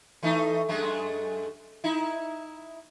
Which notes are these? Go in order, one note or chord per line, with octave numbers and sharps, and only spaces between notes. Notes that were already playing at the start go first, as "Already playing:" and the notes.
E3 A3 D#4
F#2 G#3 A3
D#4 E4